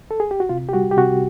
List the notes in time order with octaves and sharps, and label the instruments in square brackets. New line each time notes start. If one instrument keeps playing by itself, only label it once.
[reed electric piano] A4
G#4
G4
F#4
C3 F4
G4
G3 F#4
G4
C3 F#4